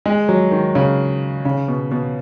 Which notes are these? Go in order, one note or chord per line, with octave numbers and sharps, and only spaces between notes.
G#3
F#3
D#3
C#3
C#3
B2
B2